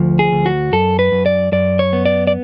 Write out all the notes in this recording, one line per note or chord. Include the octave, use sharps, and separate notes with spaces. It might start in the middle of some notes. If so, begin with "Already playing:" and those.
Already playing: D2 F3
G#4
D2
F#4
F#2 A4
B4
F#2
D5
F#2 D5
C#5
B3
D5
D5